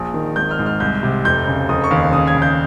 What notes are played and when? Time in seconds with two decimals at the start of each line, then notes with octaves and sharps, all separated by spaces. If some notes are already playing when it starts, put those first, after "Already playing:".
Already playing: A#1 D#6
0.14 D#3
0.36 G#1 G6
0.51 F6
0.59 G#2
0.66 F6
0.80 C2 G6
1.03 C3
1.25 F1 G6
1.47 C#3
1.69 F1 D#6
1.84 C#6
1.91 D#2
2.13 C#3 D#6
2.27 G#6
2.35 C#3
2.42 G6